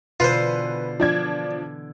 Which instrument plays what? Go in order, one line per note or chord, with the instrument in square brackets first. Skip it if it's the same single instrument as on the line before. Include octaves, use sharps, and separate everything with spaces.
[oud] B2 D3 E3 [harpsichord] F4 C5 [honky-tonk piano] B4
[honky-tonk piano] F3 D4 G#6